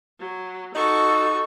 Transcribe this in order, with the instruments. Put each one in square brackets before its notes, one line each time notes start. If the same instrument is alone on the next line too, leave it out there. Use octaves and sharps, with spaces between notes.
[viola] F#3
[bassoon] D#4 [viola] F#4 A4 [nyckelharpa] C#6